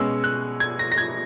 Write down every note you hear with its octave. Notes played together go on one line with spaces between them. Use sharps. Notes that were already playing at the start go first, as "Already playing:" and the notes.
Already playing: B2 G#3 C#4 E6
F#6
G#6
A#6
A#6
G#6